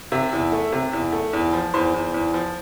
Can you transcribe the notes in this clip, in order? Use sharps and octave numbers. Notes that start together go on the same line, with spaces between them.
C3 E5
E2
A3
C3
E2
A3
E2
F3
E2 C5
E2
E2
F3